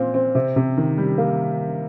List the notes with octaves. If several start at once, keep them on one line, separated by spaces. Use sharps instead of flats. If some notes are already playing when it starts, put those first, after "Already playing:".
Already playing: A#2 C4 F4
C4
C3
C3
D#3
G3
A#3